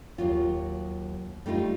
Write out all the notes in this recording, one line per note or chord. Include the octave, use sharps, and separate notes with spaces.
D#2 F#3 F4
G3 A3 D#4 F4